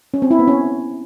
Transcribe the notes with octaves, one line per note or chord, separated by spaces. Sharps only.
C#4
C4
E4
B3
C#4